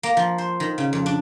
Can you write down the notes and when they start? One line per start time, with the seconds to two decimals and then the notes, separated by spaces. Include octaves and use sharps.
0.03 A#3
0.17 F3
0.38 C5
0.60 D#3
0.78 C#3
0.93 F2
1.06 D4